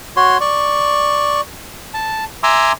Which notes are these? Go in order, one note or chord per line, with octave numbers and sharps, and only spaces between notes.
F#4 C#5 C6
D5 C#6
A5
E5 G#5 A#5 C6 D6 E6